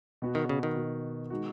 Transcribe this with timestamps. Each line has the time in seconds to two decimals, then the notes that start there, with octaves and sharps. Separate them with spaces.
0.22 B2 B3 F#4
0.35 D#3
0.49 C#3
0.63 D#3
0.76 B2 B3 F#4
1.30 G#3 D#4 F#4